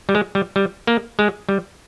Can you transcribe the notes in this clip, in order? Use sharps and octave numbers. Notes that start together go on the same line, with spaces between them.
G3
G#3
G3
G3
A#3
G#3
G3